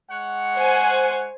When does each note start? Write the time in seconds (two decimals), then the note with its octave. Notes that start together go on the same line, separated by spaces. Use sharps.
0.11 G#3 C#5 F#5
0.58 C5 G#5